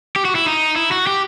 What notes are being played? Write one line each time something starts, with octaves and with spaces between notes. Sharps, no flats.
G4
F#4
E4
D#4
E4
F#4
G4